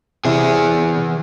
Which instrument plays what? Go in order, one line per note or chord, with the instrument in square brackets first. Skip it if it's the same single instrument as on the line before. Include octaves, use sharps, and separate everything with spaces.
[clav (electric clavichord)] C3 E4 [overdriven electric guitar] E3 G#4